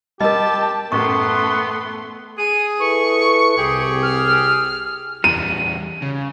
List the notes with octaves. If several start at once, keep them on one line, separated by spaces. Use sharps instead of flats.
G3 G4 A#4 D#5 A5
A1 F#2 A3 B3 C6 C#6
G#4 D#7
E4 A4 B4 C#6
C2 G4 G#4
F6
E2 G3 D#7
C#3